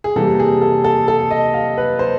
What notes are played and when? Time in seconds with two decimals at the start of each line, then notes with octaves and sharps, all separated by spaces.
0.04 G#4
0.16 C3 E3 G3 A#3 A4
0.40 G#4
0.61 A4
0.84 A4
1.08 A4
1.31 D#5
1.54 F5
1.78 B4
1.99 C5